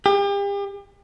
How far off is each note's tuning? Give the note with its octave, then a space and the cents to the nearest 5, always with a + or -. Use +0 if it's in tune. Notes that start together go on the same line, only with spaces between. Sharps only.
G4 +40